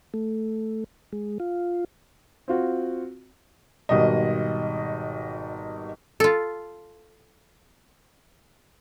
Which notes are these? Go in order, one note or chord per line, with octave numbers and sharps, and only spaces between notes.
A3
G#3
F4
C4 F4 F#4
G#1 B2 G3 D#5
F4 A4